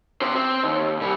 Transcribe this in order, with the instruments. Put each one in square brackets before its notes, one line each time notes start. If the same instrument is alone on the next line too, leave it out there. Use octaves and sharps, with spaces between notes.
[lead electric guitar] C#3 C5
C4
D#2
C2 G3